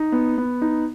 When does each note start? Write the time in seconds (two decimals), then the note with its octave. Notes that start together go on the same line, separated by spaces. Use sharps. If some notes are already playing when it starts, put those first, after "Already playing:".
Already playing: D#4
0.12 B3
0.38 B3
0.62 D#4